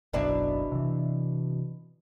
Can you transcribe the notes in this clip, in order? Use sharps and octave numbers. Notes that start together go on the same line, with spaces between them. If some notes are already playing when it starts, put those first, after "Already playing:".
F#1 B1 F#2 B2 D4 E4
C3 E3